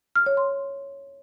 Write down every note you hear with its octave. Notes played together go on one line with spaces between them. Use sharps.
F6
C#5
C6